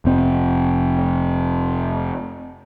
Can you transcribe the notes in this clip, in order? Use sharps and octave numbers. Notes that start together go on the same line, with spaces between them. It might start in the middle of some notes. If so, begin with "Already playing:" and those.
F1 C4